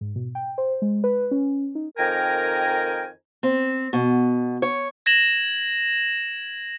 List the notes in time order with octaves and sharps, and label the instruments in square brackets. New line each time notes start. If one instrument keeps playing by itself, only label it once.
[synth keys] G#2
B2
G5
C5
G#3
B4
C#4
D#4
[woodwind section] F2 D#3 A#4 G5 G#5 A#5
[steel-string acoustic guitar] C4
B2
C#5
[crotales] G#6 A#6 E7 F#7